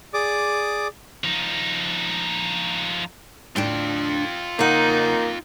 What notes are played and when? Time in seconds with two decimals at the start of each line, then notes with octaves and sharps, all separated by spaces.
0.14 G#4 D5 D6 D#6
1.24 F3 D#4
3.56 A2 D3 D4 F4 G5
4.59 C#3 A#3 D#4 F#5